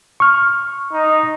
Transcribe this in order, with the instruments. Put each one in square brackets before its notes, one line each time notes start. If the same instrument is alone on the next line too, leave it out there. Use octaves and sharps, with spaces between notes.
[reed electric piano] C#6 F6
[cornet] D#4